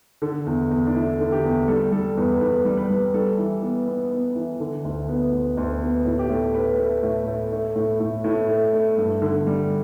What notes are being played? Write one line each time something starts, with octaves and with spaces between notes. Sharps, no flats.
D3 A4
E2
E2
D4
A3 E4
D3
G4
E2
G3 A4
G3 A4
E2 B4
A4
E2 B4
G3
B4
G3
G3 A4
E3
B3
B3
B3
E3
D3
D2
B3
D2
D2
B3
A2 E4
G4
A2 A4
A3 B4
A3 A4
A2
A2
A3
A2
A2
A2 E4
A3
A3
G2
D3
G3